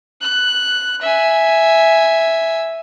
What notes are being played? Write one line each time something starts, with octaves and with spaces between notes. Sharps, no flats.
F#6
E5 G#5